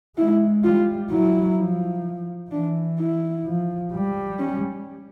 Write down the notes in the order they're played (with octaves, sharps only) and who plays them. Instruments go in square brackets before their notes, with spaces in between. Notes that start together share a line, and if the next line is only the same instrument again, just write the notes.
[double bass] G#3 [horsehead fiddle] E4
[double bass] G3 [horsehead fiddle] F4
[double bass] F#3 [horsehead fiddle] E4
[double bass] F3
[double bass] E3 [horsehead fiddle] D4
[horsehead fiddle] E4
[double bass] F3
G3
[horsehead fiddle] C#4